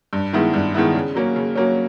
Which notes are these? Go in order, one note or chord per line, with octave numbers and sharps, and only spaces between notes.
G2
D#3 G#3 B3 E4
G2
D#3 G#3 B3 E4
C#3
F#3 A#3 C#4
C#3
F#3 A#3 C#4